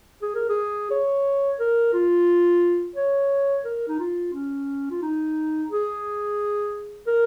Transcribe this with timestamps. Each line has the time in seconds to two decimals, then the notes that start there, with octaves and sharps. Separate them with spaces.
0.22 G#4
0.35 A#4
0.49 G#4
0.91 C#5
1.60 A#4
1.93 F4
2.96 C#5
3.65 A#4
3.88 D#4
3.99 F4
4.33 C#4
4.91 F4
5.02 D#4
5.70 G#4
7.07 A#4